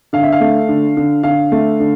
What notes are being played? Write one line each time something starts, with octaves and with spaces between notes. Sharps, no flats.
D3 F5
E5
F5
A3
D3
D3
D3 F5
A3
D3